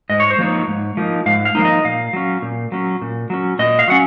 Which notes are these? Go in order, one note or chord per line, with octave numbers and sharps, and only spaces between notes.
G#2 D#5
C#5
C5
F3 A#3 D#4 C#5
G#2
F3 A#3 D#4
G#2 F5
F5
F3 A#3 D#4
D#5
A#2 F5
F#3 C#4
A#2
F#3 C#4
A#2
F#3 C#4
A#2 D#5
F5
F#3 C#4 F#5